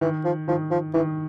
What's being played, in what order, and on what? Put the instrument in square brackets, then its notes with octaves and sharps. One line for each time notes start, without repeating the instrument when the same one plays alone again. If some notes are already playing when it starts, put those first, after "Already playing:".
[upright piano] D#3 [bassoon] E3
[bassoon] F3
[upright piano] D#3 [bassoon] F3
[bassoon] F3
[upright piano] D#3 [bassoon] E3